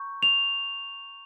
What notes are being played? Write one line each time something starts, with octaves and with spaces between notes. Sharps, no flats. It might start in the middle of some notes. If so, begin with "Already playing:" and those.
Already playing: A#5 C#6 G6
F7